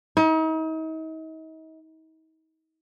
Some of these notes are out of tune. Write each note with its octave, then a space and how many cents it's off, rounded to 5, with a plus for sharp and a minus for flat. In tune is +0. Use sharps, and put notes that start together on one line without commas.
D#4 +40